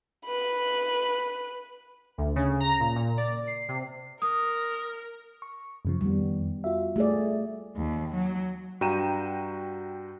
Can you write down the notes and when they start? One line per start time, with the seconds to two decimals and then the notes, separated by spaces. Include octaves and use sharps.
0.25 B4 B5
2.18 D2
2.36 C#3
2.60 A#5
2.80 A#2
2.96 A#2
3.17 D5
3.47 C7
3.69 C3
4.22 A#4 D#6
5.42 C#6
5.85 F#2 C#3 F3
6.01 F2 D#3 G3 B3
6.64 F4 F#4 E5
6.96 A3 G#4 D5
7.77 D#2
8.14 F#3
8.81 G2 F#4 G5 A#5 D#7 E7